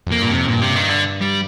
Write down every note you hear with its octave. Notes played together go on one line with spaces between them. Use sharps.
F2 A#3
G2 A#2
F2 C3
G2 A#2
C3
D#3
D3
G3